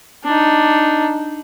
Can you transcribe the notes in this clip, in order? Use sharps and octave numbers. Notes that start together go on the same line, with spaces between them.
D4 D#4